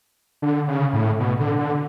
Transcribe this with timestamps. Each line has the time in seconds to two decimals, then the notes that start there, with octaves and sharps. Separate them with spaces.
0.42 D3
0.68 C#3
0.93 A2
1.20 B2
1.40 D3
1.59 D3